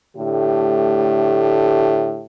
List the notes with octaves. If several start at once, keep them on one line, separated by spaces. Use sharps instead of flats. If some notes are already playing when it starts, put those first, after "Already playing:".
A2 D3 A3 G4